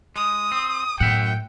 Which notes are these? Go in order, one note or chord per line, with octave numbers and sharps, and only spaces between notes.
G#3 D#6
C4
F#2 A2 E5 F#5 G5